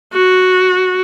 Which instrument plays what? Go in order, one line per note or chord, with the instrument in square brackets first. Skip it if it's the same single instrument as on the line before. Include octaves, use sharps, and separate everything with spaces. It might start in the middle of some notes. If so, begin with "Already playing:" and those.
[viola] F#4